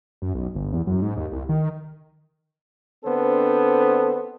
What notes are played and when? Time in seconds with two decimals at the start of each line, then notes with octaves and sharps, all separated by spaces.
0.22 F#2
0.34 B1
0.55 G1
0.73 E2
0.87 F#2
1.02 G#2
1.17 D#2
1.32 C2
1.49 D#3
3.05 D3 B3 C4 D4 A4 C5